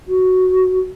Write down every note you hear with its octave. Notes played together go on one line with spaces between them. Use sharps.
F#4